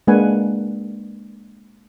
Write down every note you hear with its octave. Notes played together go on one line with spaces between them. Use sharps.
G#3 A#3 D4 B4 F#5 G#5